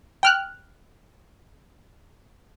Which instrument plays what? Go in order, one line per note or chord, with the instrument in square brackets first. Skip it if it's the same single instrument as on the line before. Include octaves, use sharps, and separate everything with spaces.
[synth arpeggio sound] G5 F6 F#6